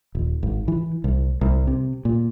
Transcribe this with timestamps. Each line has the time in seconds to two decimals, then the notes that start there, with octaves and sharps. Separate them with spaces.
0.15 D#1
0.43 G#1
0.68 E3
1.04 C2
1.41 C2
1.67 C3
2.05 A#2